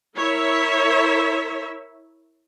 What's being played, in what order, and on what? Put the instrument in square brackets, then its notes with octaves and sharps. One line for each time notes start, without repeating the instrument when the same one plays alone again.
[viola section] E4 A#4 C#5 E5